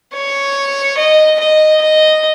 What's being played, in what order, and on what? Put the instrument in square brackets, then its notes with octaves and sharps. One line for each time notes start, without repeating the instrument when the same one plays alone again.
[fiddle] C#5
D#5
D#5
D#5